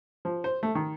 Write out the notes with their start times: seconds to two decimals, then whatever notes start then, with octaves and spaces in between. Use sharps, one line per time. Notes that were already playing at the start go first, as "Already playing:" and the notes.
0.25 F3
0.44 C5
0.63 A3
0.75 D#3